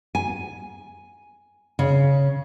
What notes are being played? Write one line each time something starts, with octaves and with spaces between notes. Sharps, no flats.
G#5
C#3